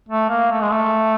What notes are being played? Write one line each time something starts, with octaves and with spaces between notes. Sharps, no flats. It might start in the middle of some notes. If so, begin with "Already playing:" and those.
A3
A#3
A3
G#3
A3